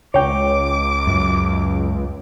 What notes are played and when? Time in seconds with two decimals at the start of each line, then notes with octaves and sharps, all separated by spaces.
0.14 C#2 C#5 G5 D6
1.07 F#2